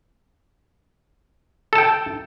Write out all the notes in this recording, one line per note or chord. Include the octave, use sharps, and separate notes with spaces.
A4 G5 A5